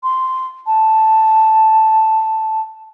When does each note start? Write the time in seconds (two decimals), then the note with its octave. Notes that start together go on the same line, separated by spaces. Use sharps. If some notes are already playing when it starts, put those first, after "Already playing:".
0.03 C6
0.67 A5